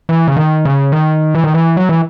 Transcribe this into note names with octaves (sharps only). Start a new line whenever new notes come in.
E3
C#3
D#3
C#3
D#3
E3
D#3
E3
F#3
E3